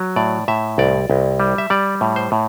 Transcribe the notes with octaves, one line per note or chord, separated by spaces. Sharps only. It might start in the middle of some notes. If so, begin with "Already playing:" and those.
Already playing: F#3
A2 D5
A2 E5
C2 D5
C2
G3
E5
G3 D5
A2
C5
A2